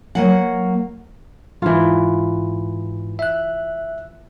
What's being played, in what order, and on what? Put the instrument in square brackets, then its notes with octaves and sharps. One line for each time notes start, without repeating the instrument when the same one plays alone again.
[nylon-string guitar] F#3 A#3 F#5
[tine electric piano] G#2 [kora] E3 F4
[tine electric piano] E5 F#6